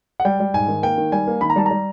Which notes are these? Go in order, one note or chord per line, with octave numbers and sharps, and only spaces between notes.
F#5
G3 G5
G3
G#2 G#5
D#3
A#3 G5
D#3
G3 G#5
A#3
D#3 B5
A#5
G3 A5
G3 A#5